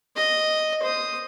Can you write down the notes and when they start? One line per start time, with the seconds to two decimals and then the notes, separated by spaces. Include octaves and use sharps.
0.16 D#5
0.83 C5 D#6